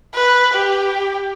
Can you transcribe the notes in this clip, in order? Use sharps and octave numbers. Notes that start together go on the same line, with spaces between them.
B4
G4